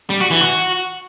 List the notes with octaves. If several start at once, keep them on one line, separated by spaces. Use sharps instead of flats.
G3
F#4
E3
F#4